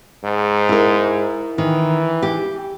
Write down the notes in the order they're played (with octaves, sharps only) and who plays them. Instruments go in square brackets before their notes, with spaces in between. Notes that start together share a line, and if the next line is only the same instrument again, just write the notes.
[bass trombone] G#2
[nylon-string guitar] E4 A#4
[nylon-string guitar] D#3 [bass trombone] E3
[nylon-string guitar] G4